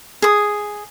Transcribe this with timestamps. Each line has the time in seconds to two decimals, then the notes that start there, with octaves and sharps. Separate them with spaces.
0.22 G#4 D#6